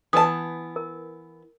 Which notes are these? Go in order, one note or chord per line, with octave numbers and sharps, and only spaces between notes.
E3 B3 A5 D#6
A#4